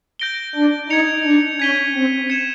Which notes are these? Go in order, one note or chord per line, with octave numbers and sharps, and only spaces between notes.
G6 A#6 D7 G7
D4
D#4 G#6 C#7 F7
D4
C#4 G#6 B6 D#7 G7
C4
G#6 C#7 E7